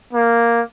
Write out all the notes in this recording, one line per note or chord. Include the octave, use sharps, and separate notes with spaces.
A#3